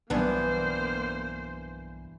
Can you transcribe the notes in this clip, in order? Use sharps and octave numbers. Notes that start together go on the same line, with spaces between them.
B1 G2 E3 A#3 B3 D4 C5 G#5